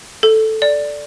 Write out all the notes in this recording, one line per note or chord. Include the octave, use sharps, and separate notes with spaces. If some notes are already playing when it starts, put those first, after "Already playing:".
A4
D5